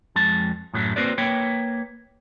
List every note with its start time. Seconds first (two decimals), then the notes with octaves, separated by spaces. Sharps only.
0.16 F2 G#3 A5
0.73 F#2 A2 F#3 A3
0.96 A#3 C4 F#4 B4 C5 D5
1.18 A#3 B4 C#5 G5